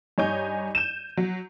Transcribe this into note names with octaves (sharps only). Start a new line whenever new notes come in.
G2 D#4 C#5 D#5 G#5 G6
G6 D#7 E7
F#3